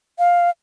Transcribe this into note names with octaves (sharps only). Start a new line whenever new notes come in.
F5